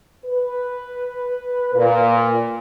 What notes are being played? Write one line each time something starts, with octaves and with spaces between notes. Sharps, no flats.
B4
A#2